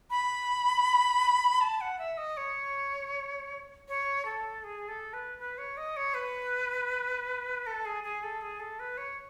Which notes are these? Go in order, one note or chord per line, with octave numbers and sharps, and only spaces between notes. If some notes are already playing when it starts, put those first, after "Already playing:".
B5
A5
F#5
E5
D#5
C#5
C#5
A4
G#4
A4
B4
B4
C#5
D#5
C#5
B4
A4
G#4
G#4
A4
G#4
A4
B4
C#5